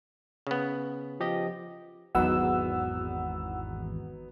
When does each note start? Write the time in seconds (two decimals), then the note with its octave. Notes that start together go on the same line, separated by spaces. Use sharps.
0.47 C#3 B3
1.20 F3 G4 D#5
2.15 G#1 E2 F#3 B3 D#4 F#5 E6